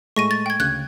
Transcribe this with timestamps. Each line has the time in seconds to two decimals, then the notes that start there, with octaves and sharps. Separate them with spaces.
0.16 A2 G#3 A3 C#6 A#6 D#7
0.31 A6
0.46 G5 G#6
0.60 D2 C#3 F#6 G#6